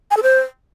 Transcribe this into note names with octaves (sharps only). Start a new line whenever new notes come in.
G#5
A4
C5